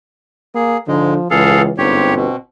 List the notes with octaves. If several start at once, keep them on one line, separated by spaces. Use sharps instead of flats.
A#3 G#4
G#2 D3 F3 G#3
C#2 E3 G#4 A4 F5
G1 G#2 C4 G4 C#5
B2